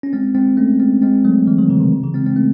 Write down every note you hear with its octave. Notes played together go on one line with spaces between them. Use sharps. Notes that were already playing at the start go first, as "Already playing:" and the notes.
C#4
G#3 C4
G#3 C4
A3 C#4
G#3 C4
G#3 C4
F#3 A3
E3 G#3
D#3 F#3
C#3 E3
C3 D#3
C#3
C#3 E3
G#3 C4
G#3 C4
A3 C#4